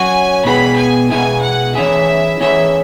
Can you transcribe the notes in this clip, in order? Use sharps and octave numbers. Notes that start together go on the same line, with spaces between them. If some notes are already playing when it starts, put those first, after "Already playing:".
Already playing: F#3 C#4 F#4 G#5
B2 B3 E4 G#4 B5
G#5
B2 B3 E4 G#4 G#5
F#5
E3 C#4 E4 G#4 E5
E3 C#4 E4 G#4 E5